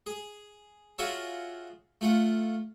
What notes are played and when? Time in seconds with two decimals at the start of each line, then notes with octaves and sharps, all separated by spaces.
0.06 G#4
0.98 F4 F#4 G#4 C#5 E5 A5
2.01 A3 F4 F#5